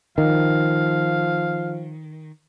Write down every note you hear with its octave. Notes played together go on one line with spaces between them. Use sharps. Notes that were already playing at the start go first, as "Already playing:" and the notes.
D#3 F3 F5